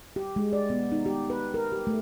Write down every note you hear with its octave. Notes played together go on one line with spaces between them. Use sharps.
G4
G#3
D5
B3
D#4
G4
B4
A#4
G4
A3